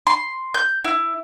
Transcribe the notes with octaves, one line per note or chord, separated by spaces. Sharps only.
C6
G6
E4